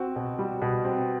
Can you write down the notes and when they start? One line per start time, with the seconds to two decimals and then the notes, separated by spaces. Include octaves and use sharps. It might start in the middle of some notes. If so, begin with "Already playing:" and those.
Already playing: C4 F#4
0.16 B2
0.39 G3
0.62 B2
0.84 C4